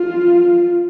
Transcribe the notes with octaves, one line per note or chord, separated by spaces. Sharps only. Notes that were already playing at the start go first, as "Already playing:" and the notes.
Already playing: F4